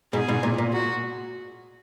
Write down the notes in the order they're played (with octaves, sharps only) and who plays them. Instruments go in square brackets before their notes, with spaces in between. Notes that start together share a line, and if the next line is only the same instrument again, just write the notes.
[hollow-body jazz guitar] G#2 B2 [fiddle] G#4
[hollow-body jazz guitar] G#2 B2
A#2
A#2
[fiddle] F#4